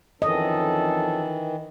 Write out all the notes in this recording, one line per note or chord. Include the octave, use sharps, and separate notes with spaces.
F2 D#3 E3 C#4 A4 D#5